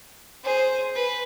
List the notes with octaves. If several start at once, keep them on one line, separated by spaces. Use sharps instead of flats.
G#4 C5
B4